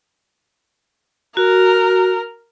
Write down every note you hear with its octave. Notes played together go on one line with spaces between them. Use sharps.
F#4 A#4